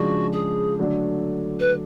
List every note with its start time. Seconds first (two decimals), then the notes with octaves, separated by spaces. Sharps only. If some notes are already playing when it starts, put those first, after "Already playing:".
Already playing: C#3 F3 G#3 D4 F#4
0.32 G#4
0.79 D3 F#3 A3 D4
1.60 B4